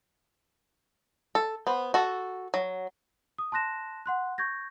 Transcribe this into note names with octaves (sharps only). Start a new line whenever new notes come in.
A4
B3 C5
F#4 A4
F#3
D#6
A5 C6 F#6 A#6 E7
F#5 C6 F#6
C#6 G6 G#6 A#6